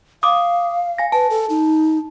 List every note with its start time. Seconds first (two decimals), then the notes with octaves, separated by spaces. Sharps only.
0.23 F5 D6 D#6
0.98 G#5 A#6
1.12 B4 A5
1.30 A4
1.50 D#4